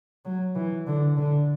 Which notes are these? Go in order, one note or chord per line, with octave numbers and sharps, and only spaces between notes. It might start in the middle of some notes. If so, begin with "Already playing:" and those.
F#3
E3
D3
D3